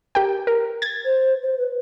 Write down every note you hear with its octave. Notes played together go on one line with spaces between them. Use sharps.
G4 A#4 G5
A#4
G#6 A6
C5
C5
B4